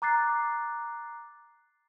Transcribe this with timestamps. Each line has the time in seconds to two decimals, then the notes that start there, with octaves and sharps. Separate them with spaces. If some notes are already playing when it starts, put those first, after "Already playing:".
0.02 A#5 D6 F#6 A6 C7